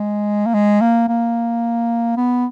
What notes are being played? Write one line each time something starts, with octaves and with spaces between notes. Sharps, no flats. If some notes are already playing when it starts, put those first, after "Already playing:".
Already playing: G#3
A#3
G#3
A#3
A#3
B3